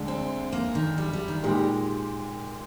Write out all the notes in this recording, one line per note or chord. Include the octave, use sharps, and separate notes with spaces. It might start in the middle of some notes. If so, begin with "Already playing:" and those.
Already playing: D2 D3 G#3
C4
A#3
D#3
G3
G3
D#3
A#2 G3 G#3 D#4 G4